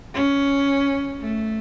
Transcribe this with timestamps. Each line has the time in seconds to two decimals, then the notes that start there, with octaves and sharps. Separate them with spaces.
0.14 C#4
1.21 A3